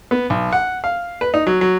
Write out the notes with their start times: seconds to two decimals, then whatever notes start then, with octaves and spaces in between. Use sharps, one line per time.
0.11 B3
0.30 B1
0.53 F#5
0.84 F5
1.21 B4
1.34 D#4
1.47 F#3
1.61 F#3